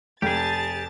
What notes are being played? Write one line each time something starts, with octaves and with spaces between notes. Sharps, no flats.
F1 G4 G#4 G5 A5 A6